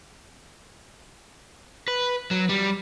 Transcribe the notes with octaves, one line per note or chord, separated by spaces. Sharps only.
B4
F#3
G3